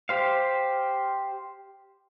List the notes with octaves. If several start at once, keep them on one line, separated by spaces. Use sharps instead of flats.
G4 C5 F5